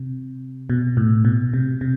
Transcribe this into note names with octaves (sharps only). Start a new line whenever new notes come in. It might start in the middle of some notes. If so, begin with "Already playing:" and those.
Already playing: C3
B2
A2
B2
C3
C3